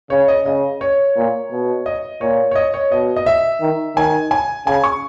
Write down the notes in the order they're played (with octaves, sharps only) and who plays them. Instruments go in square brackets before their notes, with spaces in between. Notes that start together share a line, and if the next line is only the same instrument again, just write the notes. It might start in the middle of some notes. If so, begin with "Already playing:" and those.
[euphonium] C#3 [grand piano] C#5
[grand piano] D#5
[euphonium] C#3 [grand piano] D#5
[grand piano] C#5
[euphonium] A#2
B2
[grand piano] D#5
[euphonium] A#2 [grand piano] C#5
[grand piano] C#5
D#5
C#5
[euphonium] B2 [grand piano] D#5
[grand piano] D#5
E5
[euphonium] D#3
[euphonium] D#3 [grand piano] G#5
[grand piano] G#5
[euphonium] C#3 [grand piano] G#5
[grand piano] C#6